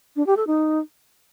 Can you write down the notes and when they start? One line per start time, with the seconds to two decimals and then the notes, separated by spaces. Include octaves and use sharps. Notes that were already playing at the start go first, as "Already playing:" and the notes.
0.16 D4
0.26 G4
0.37 A4
0.47 D#4